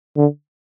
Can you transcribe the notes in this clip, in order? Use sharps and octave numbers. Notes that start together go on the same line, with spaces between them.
D3